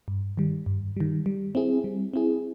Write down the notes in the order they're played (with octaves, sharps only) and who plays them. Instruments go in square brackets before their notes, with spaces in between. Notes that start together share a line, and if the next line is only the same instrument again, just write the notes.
[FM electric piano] G2
D#3 G3
G2
D#3 G3
G3
C4 E4 G#4
G3
C4 E4 G#4